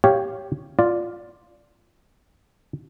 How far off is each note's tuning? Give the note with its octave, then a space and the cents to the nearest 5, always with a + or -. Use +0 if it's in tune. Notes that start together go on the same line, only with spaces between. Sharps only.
G4 +0 C#5 +0 F5 -10
F4 +0 D5 +0